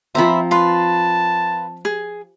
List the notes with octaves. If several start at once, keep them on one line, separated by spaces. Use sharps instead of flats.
F3 C4 C5 E5 A#5 B5
F4 B4 A5 C6
G#4